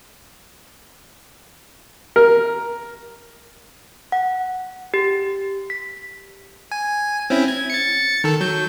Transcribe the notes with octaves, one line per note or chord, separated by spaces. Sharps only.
A#4
F#5
G4
B6
G#5
C4 C#4 E4
G#6
A6 C#7
D#3 A4
F#3 G6